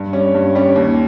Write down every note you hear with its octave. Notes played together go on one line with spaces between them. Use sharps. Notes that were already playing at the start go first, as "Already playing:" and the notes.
Already playing: G2
G3 C#4
G2
G3 C#4
D#2